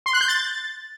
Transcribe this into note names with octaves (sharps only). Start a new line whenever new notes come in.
C6
F#6
G6
A6